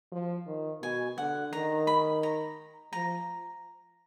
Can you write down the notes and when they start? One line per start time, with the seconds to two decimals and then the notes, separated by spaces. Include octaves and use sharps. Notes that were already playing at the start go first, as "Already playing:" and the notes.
0.12 F3
0.47 D#3
0.83 B2 G#5
1.18 D3 F#5
1.53 D#3 A#5
1.87 B5
2.23 A#5
2.92 F3 A#5